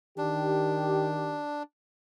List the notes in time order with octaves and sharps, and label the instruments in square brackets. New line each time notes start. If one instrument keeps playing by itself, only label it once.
[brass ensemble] D#3 G4 [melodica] D4